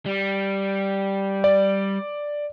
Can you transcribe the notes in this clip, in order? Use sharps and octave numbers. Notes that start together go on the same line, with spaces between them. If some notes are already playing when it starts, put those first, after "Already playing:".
G3
D5